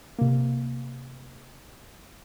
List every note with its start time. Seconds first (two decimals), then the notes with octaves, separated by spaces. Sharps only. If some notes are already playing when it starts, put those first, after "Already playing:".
0.19 C3 A#3